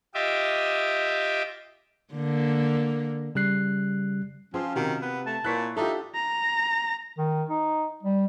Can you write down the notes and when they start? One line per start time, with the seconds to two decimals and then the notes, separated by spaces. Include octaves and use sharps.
0.14 F4 G4 D#5 E5 D6
2.14 D3 A#3
3.35 C#3 G3 F#6 C7
4.54 F3 C4 C#4 F4 G#4
4.76 C3 D#3 F#4 G4
5.02 B3
5.26 A3 A5
5.44 A#2 E4 C#5 F#6 B6
5.77 D4 D#4 F4 G4 A4 E5
6.15 A#5
7.18 D#3
7.50 D#4
8.03 G3